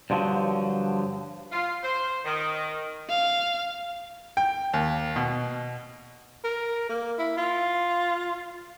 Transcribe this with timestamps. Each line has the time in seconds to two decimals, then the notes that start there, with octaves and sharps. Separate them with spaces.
0.10 G2 D3 F3 F#3
1.51 F4
1.83 C5
2.25 D#3
3.09 F5
4.37 G5
4.73 D#2
5.16 B2
6.44 A#4
6.89 A#3
7.19 E4
7.37 F4